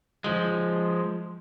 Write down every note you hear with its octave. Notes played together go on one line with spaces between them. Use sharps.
F3 G#3